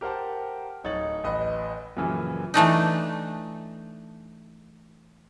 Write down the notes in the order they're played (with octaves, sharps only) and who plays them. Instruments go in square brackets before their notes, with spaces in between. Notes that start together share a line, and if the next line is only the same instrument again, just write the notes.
[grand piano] G4 A#4 C5 F#5 A5
D1 D#4 C#5 A6 F#7
A1 B4 D#5
F#2 A#2 C#3 E3 F3
[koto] E3 A3 D4 D#4